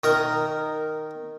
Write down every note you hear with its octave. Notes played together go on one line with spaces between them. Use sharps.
D#3 A#4